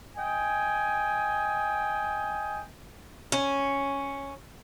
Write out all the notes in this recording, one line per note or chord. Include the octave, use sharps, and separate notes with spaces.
D#5 G5 G#5
C#4